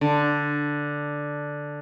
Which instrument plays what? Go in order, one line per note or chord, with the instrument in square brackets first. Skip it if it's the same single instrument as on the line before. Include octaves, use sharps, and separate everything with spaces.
[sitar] D3